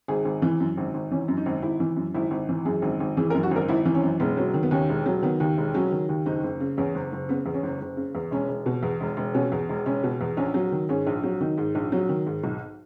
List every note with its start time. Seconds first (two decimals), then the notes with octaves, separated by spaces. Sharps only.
0.08 G#1 G#4
0.25 G#1
0.42 E3
0.60 F#2
0.77 G#1
0.94 G#1
1.11 E3 C#4
1.28 F#2
1.37 D#4
1.46 G#1
1.62 G#1 E4
1.80 E3
1.96 F#2
2.14 G#1 E4
2.31 G#1
2.49 E3
2.65 F#2 G#4
2.82 G#1
3.00 G#1
3.17 E3 G#4
3.30 A#4
3.35 F#2
3.43 F#4
3.51 G#1 A#4
3.68 G#1 E4
3.85 E3
3.95 C#4
4.03 F#2
4.20 E1 B3
4.37 F#3
4.54 D#3
4.63 B3
4.71 D#2 C#4
4.89 E1
5.06 F#3
5.23 D#3 B3
5.40 D#2
5.57 E1
5.74 F#3 C#4
5.91 D#3
6.09 D#2
6.26 F#1 D#4
6.44 F#1
6.60 C#3
6.77 E2 C#4
6.95 F#1
7.12 F#1
7.29 C#3 B3
7.46 E2
7.54 C#4
7.63 F#1
7.81 F#1
7.97 C#3
8.15 E2
8.31 E1 C#4
8.49 E1
8.66 B2
8.83 E2
9.00 E1
9.17 E1
9.34 B2 C#4
9.52 E2
9.69 E1
9.86 E1 C#4
10.04 B2
10.21 E2
10.37 A#1 C#4
10.54 F#3
10.72 D#3
10.89 G#2 C#4
11.07 A#1
11.24 F#3
11.41 D#3 D#4
11.58 G#2
11.75 A#1
11.92 F#3
12.09 D#3
12.26 G#2
12.44 B1